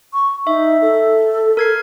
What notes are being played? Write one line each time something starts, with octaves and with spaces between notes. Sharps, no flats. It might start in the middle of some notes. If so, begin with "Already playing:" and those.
C#6
D#4 E5
A4
A#4 G#6 C7